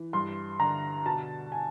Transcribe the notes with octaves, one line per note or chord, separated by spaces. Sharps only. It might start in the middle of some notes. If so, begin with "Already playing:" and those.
Already playing: E3
G2 C6
D3 A#5
B2 A5
G#5